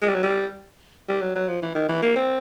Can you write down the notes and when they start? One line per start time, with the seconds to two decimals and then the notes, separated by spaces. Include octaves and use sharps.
0.02 G#3
0.08 G3
0.15 F#3
0.23 G3
1.09 G3
1.22 F#3
1.36 F#3
1.48 F3
1.62 E3
1.75 D#3
1.89 E3
2.02 A#3
2.16 C4